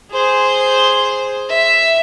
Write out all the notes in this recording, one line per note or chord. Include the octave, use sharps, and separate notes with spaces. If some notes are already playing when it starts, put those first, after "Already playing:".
G#4 C5
E5